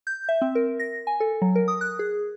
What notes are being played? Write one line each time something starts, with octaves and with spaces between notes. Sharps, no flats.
G6
E5
C4
A#4
A#6
G#5
A4
F#3
A#4
D#6
F#6
G#4